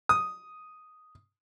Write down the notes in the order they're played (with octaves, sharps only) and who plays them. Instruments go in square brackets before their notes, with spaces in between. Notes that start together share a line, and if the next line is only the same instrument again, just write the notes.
[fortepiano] D#6